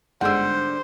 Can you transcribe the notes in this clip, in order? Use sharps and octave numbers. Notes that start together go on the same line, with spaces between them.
G1 G#2 D3 G3 C5 F#5 E6